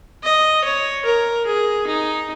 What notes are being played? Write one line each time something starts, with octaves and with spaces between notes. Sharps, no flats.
D#5
C#5
A#4
G#4
D#4